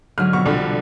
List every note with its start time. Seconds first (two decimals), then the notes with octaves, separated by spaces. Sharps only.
0.18 G#2 D3 F#3 F6
0.33 F2 B2 C#6
0.45 C2 D4 F4 A4